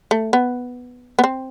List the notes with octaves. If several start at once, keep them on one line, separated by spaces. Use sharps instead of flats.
A3
B3
B3
C4